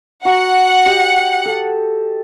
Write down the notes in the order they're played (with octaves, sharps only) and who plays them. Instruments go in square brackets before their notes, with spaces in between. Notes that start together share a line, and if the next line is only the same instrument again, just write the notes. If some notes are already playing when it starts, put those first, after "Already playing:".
[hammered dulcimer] F#4 A#5 [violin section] F#5
[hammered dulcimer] G4 D#5
A4